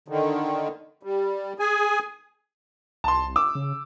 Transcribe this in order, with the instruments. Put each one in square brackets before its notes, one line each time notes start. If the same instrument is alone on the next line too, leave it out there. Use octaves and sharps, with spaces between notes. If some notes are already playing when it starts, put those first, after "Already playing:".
[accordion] D3 D#3
G3
G#4 G#5
[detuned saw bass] C2 [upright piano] A5 C6
[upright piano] D6 E6
[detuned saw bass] C#3